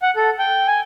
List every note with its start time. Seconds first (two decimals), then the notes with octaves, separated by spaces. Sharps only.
0.02 F#5
0.16 A4
0.39 G5
0.67 G#5